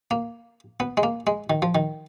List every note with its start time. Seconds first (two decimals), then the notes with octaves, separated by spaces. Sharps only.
0.11 A#3
0.80 B3
0.97 G#3
1.03 A#3
1.27 G#3
1.50 D#3
1.62 F3
1.75 D#3